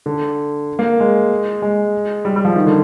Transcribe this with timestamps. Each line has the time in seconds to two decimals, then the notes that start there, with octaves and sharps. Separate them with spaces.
0.06 D3
0.79 A#3
1.00 G#3
1.62 G#3
2.25 G3
2.36 G3
2.45 F3
2.56 D#3
2.66 D3